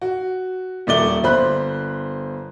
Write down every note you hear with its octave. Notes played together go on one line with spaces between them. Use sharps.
F#4
D#1 A3 D5 G7
G1 C5 B5 F#6